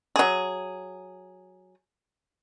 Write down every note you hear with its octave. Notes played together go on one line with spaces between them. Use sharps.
F#3 G#4